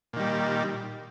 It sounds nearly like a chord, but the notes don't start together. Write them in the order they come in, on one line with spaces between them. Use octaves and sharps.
A#2 D#3 G3